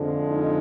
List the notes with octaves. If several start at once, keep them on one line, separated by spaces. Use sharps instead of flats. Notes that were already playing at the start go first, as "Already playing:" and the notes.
Already playing: F2 D3 F3 G#3
D#4